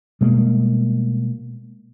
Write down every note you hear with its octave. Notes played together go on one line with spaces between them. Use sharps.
B2 G3 G#3 A#3